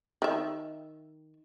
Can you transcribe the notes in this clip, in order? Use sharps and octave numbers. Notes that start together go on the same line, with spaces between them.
D#3 E5